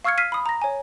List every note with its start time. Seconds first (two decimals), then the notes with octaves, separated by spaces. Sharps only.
0.04 F5 C#6 E6 F6 G#6 C#7
0.18 F6 B6 C7 D#7
0.32 B5 D#6
0.46 A#5 A#6
0.62 C#5 G#5